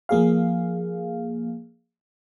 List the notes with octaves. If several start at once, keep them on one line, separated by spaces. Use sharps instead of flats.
F3 A#3 G#4 F5